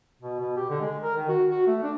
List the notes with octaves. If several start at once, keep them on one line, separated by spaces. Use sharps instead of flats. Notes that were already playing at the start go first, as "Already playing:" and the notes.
B2
B2
G4
D3
G#3
A#4
D#3
F#4
F#4
A3
D4